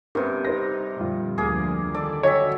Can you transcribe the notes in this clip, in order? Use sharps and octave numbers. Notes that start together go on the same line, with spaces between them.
G2 C3 B3 C#4 A#4
D#4 B4 C5 A#6
F2 A#2 D3 G3 F4
D2 F3 A#3 G#4
D3 D#3 A4 D5
F#3 C#5 D#5 E5 G5 G#5